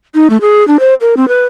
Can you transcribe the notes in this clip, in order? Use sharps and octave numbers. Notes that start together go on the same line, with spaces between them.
D#4
A3
G#4
D4
C5
A#4
C4
B4